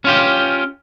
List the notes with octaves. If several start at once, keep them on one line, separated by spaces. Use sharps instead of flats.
C#4 F4 G4